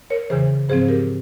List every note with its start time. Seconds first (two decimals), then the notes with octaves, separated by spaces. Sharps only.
0.10 A#4 C#5
0.30 E2 C#3 E3 G#4 C5
0.69 G#2 F3 C4 G#4 C5
0.88 G4 A#4